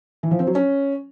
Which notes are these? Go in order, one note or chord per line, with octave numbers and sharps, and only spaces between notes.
E3
F3
C4
F#3
C#4